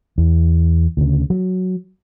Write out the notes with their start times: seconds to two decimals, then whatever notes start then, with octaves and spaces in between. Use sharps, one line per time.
0.18 E2
0.97 D2 C#3
1.30 F#3